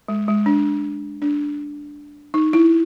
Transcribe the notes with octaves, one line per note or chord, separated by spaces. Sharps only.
G#3
G#3
D4
D4
D#4
E4